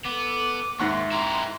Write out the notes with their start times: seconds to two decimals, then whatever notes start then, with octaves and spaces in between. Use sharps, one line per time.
0.05 B3 A4 D6
0.79 D#2 G#2 E5 F#5 C6 C#6
1.11 E4 G4 A#5